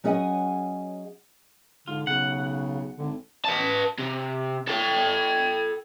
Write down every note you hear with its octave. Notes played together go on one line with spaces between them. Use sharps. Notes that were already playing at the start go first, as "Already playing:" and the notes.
F#3 C#4 G#4 D#5 F#5 G#5
G#2 D3 F4
B1 C#3 F#5
G#1 D3
B4 A5
C3
A4 G5